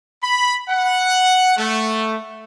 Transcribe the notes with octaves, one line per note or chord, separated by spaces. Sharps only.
B5
F#5
A3